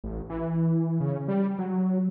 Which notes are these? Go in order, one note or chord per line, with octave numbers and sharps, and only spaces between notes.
A1
E3
C#3
G3
F#3